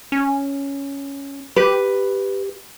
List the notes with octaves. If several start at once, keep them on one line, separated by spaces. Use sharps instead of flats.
C#4
G4 B4